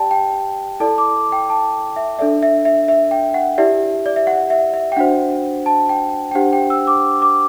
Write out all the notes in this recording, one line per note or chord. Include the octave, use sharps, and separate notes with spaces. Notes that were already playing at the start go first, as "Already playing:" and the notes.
Already playing: G4 D5 G5 A5
G5
E4 A4 D5 A5
D6
G5
A5
E5
D4 A4 D5 E5
E5
E5
E5
G5
F#5
E4 G4 D5 E5
D5
E5
F#5
E5
E5
G5
D4 F#4 C5 F#5
A5
G5
G5
D4 G4 C5 F#5
G5
E6
D6
D6